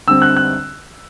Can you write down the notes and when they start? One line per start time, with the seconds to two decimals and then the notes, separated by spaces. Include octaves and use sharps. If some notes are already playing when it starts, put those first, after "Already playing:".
0.08 D3 G3 C4 E6
0.22 F#6
0.36 F#6